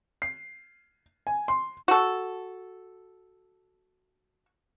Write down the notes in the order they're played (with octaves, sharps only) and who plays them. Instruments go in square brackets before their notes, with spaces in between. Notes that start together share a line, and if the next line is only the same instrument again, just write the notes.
[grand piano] C7
G#5
C6
[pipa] F#4 A4